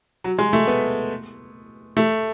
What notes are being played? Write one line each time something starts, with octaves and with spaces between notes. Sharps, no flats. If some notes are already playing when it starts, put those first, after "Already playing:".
F#3
G#3
A3
B3
A3